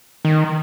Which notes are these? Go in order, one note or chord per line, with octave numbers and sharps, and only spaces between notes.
D#3